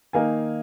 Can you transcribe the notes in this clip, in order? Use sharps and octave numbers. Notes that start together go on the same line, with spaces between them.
D#3 A#3 D#4 F5 G#5